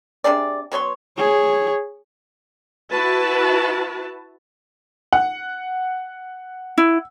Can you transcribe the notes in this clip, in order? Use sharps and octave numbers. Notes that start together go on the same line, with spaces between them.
C3 D4 G#4 D5
F#3 B3 C#5 C6
G#4 C#5
E4 F#4 B4 A5
F#5
E4